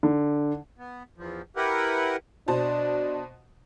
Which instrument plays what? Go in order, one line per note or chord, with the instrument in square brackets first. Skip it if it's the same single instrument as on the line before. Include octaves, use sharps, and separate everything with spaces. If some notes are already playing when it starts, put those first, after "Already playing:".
[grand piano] D3
[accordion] B3
E2 F3
E4 G4 A#4 B4 F#5
[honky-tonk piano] B2 C5 A5 [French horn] D4